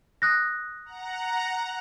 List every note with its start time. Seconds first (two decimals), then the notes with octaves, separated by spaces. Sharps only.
0.22 D#6 F#6 A#6
0.85 F#5 A#5